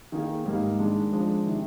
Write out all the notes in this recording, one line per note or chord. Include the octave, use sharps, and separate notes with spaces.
D#3 A#3 D#4 G#4
G#2 G3 A#3
D#3 G#3 D4
F3 G#3 D4
C3 D#3